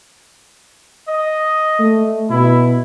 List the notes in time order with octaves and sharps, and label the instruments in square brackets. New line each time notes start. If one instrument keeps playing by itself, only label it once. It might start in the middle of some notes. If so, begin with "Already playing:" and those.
[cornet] D#5
[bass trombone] A3
[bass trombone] B2 [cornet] E4